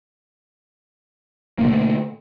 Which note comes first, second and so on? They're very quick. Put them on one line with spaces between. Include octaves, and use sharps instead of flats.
A#3 B2 D3 A3